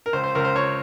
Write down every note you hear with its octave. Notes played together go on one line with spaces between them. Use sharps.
A#4
C#2 C5
C5
C#2 A#4
C5
C#2 C#5